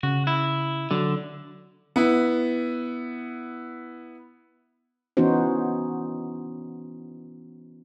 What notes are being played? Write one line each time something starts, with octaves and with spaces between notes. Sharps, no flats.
C#3 F#4
E4
D3 F#3
B3 E4
E3 B3 C#4 D#4 F#4 C5